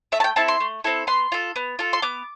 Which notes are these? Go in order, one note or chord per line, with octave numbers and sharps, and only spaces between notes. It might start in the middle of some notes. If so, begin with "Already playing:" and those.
A3 E5
A5
G5
C4 E4 A4 A5
C6
A3
C4 E4 A4
B3 C6
F4 A4
B3
F4 A4
C6
B3 D6